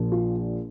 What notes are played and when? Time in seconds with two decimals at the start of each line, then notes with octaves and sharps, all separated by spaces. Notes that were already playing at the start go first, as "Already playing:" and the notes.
Already playing: A#1 A#2 F3 A#3
0.12 F4